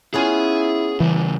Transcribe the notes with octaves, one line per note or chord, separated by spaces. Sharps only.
B3 C#4 E4 F4 G#4 G#5
C#3 E3 G3